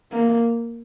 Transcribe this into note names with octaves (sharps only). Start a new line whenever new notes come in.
A#3